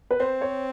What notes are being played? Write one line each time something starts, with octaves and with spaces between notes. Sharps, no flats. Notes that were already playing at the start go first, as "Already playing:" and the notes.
B4
C4 C5
C#5